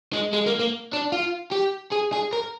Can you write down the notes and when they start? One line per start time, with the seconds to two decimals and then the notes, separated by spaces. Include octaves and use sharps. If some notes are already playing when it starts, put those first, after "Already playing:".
0.13 G#3
0.33 G#3
0.46 A#3
0.59 A#3
0.93 D4
1.12 F4
1.52 G4
1.92 G#4
2.13 G#4
2.33 A#4